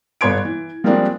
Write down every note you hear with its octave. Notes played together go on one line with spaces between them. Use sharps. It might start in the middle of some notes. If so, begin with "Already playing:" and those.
G1 B3 C#5 C6 G#6 D7
E3
F3 G3 G#3 A#3 C4 D4